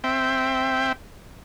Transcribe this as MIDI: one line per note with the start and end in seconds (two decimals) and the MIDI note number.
0.04 0.92 60
0.04 0.92 76
0.04 0.92 79